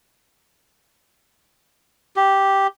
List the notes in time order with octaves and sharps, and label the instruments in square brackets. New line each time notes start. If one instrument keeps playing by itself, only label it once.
[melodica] G4